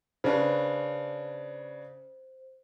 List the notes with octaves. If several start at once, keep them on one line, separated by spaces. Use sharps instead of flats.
C#3 D4 B4 C5